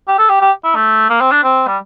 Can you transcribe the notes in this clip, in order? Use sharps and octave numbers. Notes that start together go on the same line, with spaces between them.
G4
A4
G4
G4
E4
A3
A#3
C4
D4
C4
G3